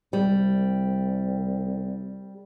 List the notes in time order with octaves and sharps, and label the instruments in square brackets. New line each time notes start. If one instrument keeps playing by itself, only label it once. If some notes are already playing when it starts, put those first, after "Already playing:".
[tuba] C2 [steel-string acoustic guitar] G3